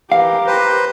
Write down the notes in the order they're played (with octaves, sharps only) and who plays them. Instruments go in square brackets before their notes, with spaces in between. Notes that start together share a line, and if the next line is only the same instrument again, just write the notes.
[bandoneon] E3 [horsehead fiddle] G4 A#4 [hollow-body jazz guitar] F5
[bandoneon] B4 C5